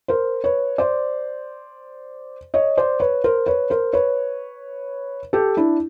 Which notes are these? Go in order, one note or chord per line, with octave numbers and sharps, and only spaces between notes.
A#4 C5
B4 C#5
C5 D5
C#5 D#5
C5 D5
B4 C#5
A#4 C5
B4 C#5
A#4 C5
B4 C#5
G4 A4
D4 E4